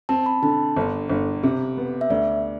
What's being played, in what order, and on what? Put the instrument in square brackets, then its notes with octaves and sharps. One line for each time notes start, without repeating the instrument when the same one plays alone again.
[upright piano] C4 [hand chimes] A5
[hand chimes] B5
[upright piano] D3 [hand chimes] A5
[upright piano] G1
G1
C3
B3
[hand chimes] E5
[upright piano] D2 [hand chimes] D5